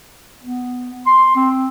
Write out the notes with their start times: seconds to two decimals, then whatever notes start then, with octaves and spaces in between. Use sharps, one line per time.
0.43 B3
1.06 C6
1.36 C4